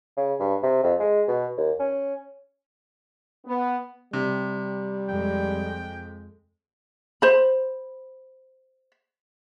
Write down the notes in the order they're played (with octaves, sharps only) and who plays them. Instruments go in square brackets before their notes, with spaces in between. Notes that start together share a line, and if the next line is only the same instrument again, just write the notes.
[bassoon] C#3
G2
C3
F2
G#3
B2
D#2
C#4
[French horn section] B3
[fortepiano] C3 [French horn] G3
[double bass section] F2 G#3 [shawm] G5
[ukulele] C5 B5